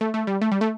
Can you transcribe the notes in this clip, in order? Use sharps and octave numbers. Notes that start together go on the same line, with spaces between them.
A3
A3
G3
A3
G3
A3